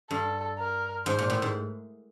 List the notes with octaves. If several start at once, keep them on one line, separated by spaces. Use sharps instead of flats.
G2 A4
A#4
G#2 C5
A#2
A2
G#2